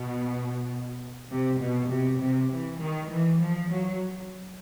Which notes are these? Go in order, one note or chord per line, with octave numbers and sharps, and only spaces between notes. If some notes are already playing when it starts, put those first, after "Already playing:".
Already playing: B2
C3
B2
C3
C3
E3
D#3
E3
F3
F#3